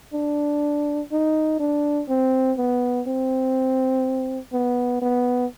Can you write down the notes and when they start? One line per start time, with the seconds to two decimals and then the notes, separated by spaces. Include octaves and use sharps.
0.14 D4
1.12 D#4
1.60 D4
2.09 C4
2.58 B3
3.07 C4
4.53 B3
5.02 B3